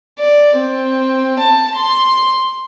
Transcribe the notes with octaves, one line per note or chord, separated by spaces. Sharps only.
D5
C4
A5
C6